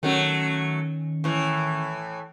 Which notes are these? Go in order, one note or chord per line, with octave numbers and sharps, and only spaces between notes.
D#3 F#3 A3 C#4
A2 E3